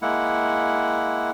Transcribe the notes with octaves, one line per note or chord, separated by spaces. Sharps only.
G#3 A#3 E4 F#5